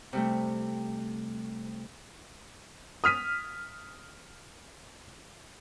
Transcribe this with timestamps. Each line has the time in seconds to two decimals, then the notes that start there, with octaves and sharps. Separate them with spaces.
0.13 C3 G3 A3
3.04 D#6 F6 B6 D#7